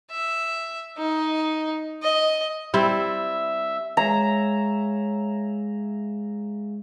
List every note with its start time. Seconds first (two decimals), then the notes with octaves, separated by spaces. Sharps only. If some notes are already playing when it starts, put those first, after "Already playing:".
0.11 E5
0.97 D#4
2.03 D#5
2.74 G3 C4 E4 E5
3.97 G#3 G#4 C#5 E5 F5 A#5